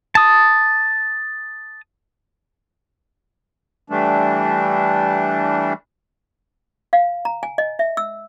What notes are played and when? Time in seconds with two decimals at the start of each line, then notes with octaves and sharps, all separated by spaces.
0.15 A5 D#6
3.90 E3 G3 A3 D4
6.93 F5
7.25 A#5
7.43 G#5
7.58 D#5
7.79 E5
7.97 E6